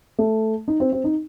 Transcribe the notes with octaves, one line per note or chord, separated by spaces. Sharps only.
A3
D#4
C4
C4
D#4